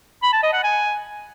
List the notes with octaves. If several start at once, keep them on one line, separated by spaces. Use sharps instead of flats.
B5
A5
D#5
F#5
G#5